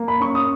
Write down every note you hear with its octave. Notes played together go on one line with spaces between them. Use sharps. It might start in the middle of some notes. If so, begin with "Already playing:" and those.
Already playing: A#3
B5
C#4 C#6
D#6